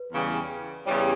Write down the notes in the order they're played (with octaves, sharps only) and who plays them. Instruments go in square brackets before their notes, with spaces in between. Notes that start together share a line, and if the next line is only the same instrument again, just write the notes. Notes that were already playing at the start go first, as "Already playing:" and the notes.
Already playing: [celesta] B4
[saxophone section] E2 C#3 E3 G3
[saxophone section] E2 C#3 E3 G3 [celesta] C#5